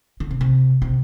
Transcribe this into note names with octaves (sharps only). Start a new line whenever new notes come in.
D3
C3
C3
C3